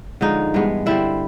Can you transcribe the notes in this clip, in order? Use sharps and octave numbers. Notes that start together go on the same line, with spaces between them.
D3 F3 G#3 D#4
G2 E3 G#3 B3
D3 G3 C4 E4